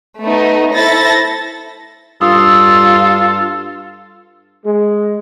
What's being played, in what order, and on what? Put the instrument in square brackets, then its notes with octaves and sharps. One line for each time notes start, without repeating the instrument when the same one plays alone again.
[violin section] A3 B3 D#4
E4 A4 C5 E5 A6 A#6
[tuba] G2 [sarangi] F4 [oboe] A4 [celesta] D#6 E6
[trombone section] G#3